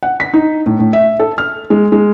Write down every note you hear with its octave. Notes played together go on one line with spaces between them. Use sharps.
F#5
B6
D#4
A2
A2
E5
A4
F6
G#3
G#3